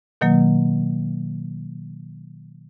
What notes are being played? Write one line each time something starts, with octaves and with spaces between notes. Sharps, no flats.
B2 D#3 F#3 A#3